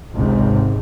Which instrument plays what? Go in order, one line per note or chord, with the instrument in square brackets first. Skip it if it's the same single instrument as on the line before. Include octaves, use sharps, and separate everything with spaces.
[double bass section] G#1 C#2 G#2 C3